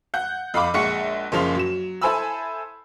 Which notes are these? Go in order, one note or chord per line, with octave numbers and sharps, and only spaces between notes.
F#5 G6
F2 F5 B5 D6
A#1 G#3 F#5 C#6 C#7
F#1 C#3 F3 F4 C6 F7
F#3 E7
E4 A4 C5 G#5 B5 E6